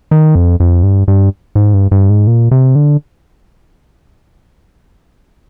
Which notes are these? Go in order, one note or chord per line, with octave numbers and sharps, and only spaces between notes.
D#3
F2
F2
G2
G2
G#2
G2
G2
G#2
A#2
C3
D3